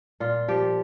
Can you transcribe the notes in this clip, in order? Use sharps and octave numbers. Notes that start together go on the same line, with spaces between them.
A#2 F4
F3 G4